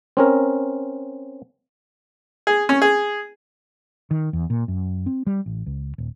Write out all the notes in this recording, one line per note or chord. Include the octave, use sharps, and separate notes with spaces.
C4 C#4 A#4
G#4
C#4
G#4
D#3
E2
A#2
F#2
C4
G3
A1
C#2
D#1